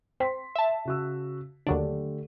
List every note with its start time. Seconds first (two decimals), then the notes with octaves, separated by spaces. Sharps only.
0.20 C4 C6 B6
0.55 E5 A5
0.85 C#3 F#4 E6
1.67 D#2 D3 F#3 A3 D4 G4